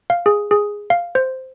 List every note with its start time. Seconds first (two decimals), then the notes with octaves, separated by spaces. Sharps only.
0.10 F5
0.26 G#4
0.51 G#4
0.90 F5
1.15 C5